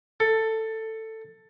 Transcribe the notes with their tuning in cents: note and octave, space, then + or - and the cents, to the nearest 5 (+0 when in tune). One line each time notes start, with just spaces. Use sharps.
A4 +10